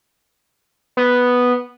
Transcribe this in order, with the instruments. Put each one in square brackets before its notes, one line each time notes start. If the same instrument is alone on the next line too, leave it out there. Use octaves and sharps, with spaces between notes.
[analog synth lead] B3